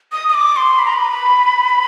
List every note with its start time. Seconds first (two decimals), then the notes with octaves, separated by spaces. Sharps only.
0.12 D#6
0.29 D#6
0.34 D6
0.56 C6
0.79 B5
0.85 A#5
0.93 B5